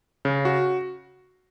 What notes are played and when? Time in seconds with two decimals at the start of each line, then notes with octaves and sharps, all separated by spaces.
0.25 C#3
0.45 F#4